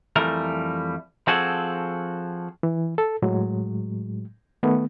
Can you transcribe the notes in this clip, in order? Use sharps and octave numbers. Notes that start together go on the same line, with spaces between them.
F2 E3 G3 A3 A#4
F3 C4 F#4 G#4 A4
E3
A4
A2 F#3 G#3
D#3 A3 B3